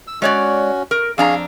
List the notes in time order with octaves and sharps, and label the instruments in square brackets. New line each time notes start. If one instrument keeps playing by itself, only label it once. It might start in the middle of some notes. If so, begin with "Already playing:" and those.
[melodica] E6
[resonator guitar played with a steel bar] G#3 C#5 D5 [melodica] C#4 F#4
[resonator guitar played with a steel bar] A#4
[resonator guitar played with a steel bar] F2 D4 A#5 [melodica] G#4 F5